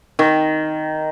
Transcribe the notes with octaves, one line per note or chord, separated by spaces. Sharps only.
D#3